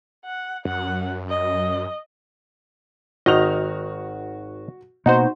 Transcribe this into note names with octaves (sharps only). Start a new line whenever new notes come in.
F#5
F#2 F#5
D#5
G#1 D#3 F#4 D#5 F7
B2 A#3 B3 D#4 F#4 C5